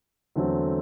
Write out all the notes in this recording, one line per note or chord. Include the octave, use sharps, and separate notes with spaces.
E2 D3 F#3 A3 C4